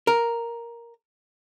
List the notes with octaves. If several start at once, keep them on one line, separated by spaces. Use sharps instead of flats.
A#4